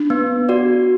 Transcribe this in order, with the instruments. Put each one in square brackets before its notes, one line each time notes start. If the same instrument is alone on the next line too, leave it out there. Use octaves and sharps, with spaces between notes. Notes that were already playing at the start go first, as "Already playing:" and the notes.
Already playing: [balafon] D4
[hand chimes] B3
F#4 D5